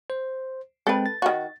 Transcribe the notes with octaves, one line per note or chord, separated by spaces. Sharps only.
C5
G#3 C4 A4 B4 G5
A6
D#3 F#4